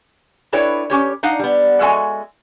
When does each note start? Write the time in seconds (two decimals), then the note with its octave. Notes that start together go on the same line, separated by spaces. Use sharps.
0.53 D4 E4 A4 B4 C#5 G5
0.90 C#4 G4 C#5
1.23 D4 D#4 F5 F#5
1.39 G3 B3
1.81 G#3 F#4 A4 E5 G#5